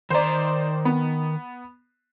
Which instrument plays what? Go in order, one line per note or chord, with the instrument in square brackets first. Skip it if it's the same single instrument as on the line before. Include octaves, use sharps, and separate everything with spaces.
[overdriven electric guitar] D#3 A#5 [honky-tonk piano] C5 D5
[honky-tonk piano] B3